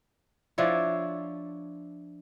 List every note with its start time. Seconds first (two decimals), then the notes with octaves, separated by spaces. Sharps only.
0.58 F3 D4 E4 C#5